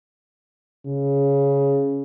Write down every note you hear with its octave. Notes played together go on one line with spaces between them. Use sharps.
C#3